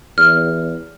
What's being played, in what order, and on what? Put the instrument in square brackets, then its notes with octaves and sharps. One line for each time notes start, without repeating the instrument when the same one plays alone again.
[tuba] E2 [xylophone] F6